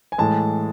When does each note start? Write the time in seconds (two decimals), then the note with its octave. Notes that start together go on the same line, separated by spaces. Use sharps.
0.12 G#5
0.18 A2 E3 G#3 A5